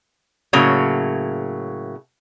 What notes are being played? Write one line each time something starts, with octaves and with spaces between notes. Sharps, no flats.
A2 C#3 F#3 A#3